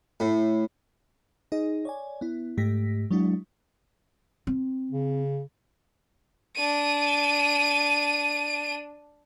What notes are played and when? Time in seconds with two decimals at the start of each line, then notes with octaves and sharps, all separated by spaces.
0.20 A2
1.52 D#4 G#4 D#5
1.85 C#5 D5 G#5
2.21 B3 E4
2.57 G#2 A3 G4 A#6 B6
3.11 F#3 G#3 D4 E4 F#4
4.47 C4
4.91 C#3
6.56 D4 D#7